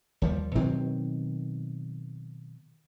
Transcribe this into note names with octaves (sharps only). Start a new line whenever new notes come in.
D#2 F3 G3
B2 D#3 F#3 C4